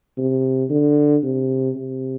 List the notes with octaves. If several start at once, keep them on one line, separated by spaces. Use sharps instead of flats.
C3
D3
C3
C3